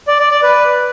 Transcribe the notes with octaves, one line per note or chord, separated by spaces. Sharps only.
D5
D5
D5
B4